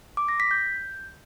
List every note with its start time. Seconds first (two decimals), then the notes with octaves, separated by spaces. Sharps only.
0.17 D6
0.28 A#6
0.40 B6
0.51 G6